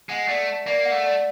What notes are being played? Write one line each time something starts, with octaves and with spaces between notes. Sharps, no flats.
G#3 F#5
A3 D5
A5
A#3 D5
F#5
A3
D5